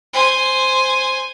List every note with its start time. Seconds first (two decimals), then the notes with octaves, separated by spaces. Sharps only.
0.13 C5 G#5